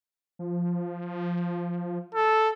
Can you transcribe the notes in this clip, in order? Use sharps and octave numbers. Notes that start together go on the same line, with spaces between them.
F3
A4